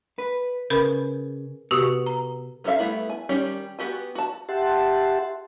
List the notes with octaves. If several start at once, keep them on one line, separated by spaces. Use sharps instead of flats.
B4
C#3 A#4 B4 B5
C3 B3 F#4 G4
A#5
B3 C#4 A4 E5 F5
G3 A3 B3 E4
G#5
D#3 G3 C#4 G4 C#5
B3 F#4 G4 G#5
F#4 A5
G4 E5 F#5 A5 C6